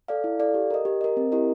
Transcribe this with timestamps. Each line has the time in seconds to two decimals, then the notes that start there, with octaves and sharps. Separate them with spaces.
0.08 A4 D5 F5
0.24 E4
0.39 A4 D5 F5
0.54 G4
0.70 A#4 D#5
0.85 G4
1.01 A#4 D#5
1.17 C4
1.32 E4 G4 A#4 D#5